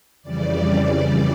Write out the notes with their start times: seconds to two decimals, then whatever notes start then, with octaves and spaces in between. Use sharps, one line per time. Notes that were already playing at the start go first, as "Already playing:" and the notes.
0.22 F2 C#3 E3 G3 D5